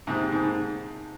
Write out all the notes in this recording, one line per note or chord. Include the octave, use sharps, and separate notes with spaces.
G#2 C3
G#2
G#2